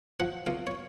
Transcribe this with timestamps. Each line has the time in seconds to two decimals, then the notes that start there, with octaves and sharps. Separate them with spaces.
0.20 F3 F#5
0.47 C#2 F5
0.67 C#5